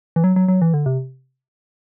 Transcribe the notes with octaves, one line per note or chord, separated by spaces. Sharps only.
E3
F#3
F#3
F#3
E3
D3
C3